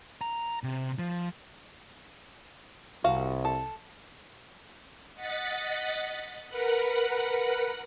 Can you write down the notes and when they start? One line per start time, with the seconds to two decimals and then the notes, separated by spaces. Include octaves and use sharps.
0.21 A#5
0.63 C3
0.99 F3
3.04 C2 F#4 F5
3.45 A4
5.14 D#5 F#5 A6 B6
6.49 A#4 B4 F#5 B5